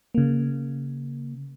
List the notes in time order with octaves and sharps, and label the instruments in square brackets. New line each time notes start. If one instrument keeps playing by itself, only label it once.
[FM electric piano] C#3 A#3